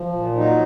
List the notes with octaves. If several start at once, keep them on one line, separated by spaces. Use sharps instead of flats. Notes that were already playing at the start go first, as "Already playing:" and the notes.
Already playing: F3
A#2
F#3 D#4